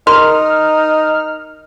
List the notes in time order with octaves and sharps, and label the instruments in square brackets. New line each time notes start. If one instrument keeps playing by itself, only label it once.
[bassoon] D#4 [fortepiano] A#4 [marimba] C6 [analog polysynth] F6